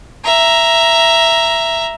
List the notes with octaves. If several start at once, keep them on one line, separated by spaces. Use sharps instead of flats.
E5 A#5